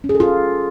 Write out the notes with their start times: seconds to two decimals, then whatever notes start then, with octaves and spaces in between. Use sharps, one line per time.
0.04 C#4
0.09 G#4
0.15 A4
0.20 F4